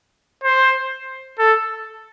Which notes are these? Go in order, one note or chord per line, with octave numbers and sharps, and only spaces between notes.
C5
A4